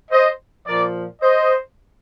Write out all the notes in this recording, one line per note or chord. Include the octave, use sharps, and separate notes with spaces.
C5 D#5
A#2 F3 A#4 D5
C5 D#5